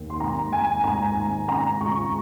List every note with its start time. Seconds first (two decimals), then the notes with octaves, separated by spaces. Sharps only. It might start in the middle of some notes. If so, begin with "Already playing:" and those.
Already playing: D#2
0.10 C6
0.20 G#1 A#5
0.52 G#1 G#5
0.84 G#2 A#5
1.17 G#1
1.48 C#3 A#5
1.80 C#2 C#6